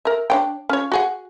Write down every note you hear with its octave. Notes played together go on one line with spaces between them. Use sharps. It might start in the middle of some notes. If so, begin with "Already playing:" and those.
A#4 E5
D4 C#5 G5
C#4 F4 C#5
F#4 G#4 F#5